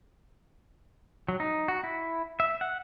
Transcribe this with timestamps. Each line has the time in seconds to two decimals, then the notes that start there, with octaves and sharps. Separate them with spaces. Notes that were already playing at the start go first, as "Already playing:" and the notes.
1.28 F#3
1.40 D#4
1.68 F#4
1.84 E4
2.40 E5
2.61 F#5